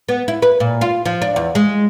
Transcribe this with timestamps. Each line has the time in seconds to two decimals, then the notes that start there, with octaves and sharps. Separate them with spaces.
0.09 B3
0.28 E4
0.42 B4
0.60 A#2
0.81 F4
1.05 F3
1.22 D4
1.36 E2
1.55 G#3